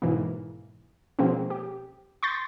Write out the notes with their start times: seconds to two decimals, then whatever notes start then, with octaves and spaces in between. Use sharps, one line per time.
0.02 G#2 B2 E3 A#3
1.19 B2 F3 G#3 A#3 C4 C#4
1.50 G4
2.23 C6 C#6 G6 A6